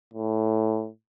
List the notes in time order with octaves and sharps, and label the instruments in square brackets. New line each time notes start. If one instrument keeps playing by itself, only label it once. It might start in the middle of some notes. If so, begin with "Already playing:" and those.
[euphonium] A2